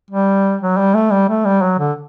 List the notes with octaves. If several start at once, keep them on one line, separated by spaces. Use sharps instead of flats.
G3
F#3
G3
A3
G3
A3
G3
F#3
D3